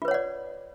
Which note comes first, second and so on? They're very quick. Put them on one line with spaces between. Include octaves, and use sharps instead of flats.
F4 B4 C#5 F#5 D5